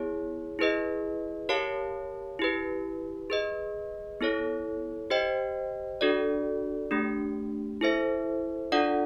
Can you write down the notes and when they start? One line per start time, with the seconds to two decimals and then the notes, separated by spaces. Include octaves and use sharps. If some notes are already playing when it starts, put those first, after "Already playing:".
Already playing: B3 E4 G#4 C#5
0.59 E4 G#4 B4 D#5
1.49 G4 A#4 C#5 F5 A5
2.39 E4 G4 B4
3.30 G#4 B4 D#5
4.21 B3 E4 A4 C#5
5.10 G4 C5 D#5 G5
6.01 D4 F#4 A4 D5
6.91 A3 D4 G4
7.81 E4 A4 C5 E5
8.72 D4 F4 A4 D5 F#5